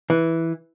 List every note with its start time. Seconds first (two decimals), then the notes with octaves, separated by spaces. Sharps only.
0.10 E3